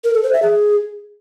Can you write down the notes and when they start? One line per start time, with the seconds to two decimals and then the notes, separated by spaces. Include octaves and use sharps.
0.04 A#4
0.14 A4
0.23 C5
0.33 E5
0.42 G#4